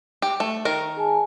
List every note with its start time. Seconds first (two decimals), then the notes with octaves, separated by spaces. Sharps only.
0.22 G4
0.40 A3
0.65 D#3 A#4
0.97 G#4 G#5 A5